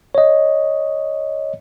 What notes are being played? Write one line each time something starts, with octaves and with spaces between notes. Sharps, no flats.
C#5 D#5